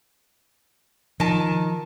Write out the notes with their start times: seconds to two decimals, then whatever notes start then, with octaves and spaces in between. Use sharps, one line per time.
1.20 D#3 F3 A5